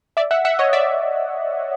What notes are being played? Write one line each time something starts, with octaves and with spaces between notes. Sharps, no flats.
D5 E5
E5 F#5
E5 F#5
C#5 D#5
D5 E5